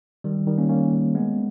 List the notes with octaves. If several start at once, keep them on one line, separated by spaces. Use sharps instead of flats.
D#3 G3
D#3 G3
A#3 C#4
A#3 C#4
G#3 B3